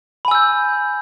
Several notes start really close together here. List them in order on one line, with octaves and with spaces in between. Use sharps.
B5 G#5 E6 G6